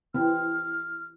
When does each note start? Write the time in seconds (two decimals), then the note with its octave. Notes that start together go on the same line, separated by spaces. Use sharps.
0.14 E3 C4 F6